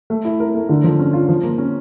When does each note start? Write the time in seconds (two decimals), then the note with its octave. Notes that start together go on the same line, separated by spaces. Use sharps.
0.10 A3
0.25 E4
0.40 A#4
0.55 A3
0.69 D3
0.84 F3
0.99 C#4
1.13 F4
1.29 F3
1.43 A#3
1.58 C#4